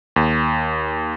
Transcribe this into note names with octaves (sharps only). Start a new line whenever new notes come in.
D#2